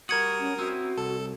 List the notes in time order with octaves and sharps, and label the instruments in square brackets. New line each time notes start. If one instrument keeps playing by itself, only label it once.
[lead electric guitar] G3 F#4 [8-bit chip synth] A#4 D#6 [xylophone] G#6 C#7 F#7
[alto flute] C#4
[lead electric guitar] C4 E4 [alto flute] F#4
[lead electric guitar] C2 [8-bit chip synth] A4